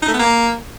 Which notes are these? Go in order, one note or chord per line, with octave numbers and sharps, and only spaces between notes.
D#4
A3
B3
A#3